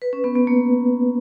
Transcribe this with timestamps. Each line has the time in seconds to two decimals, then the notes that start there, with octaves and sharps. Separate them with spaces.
0.02 B4
0.13 C#4
0.24 B3
0.35 B3
0.47 A#3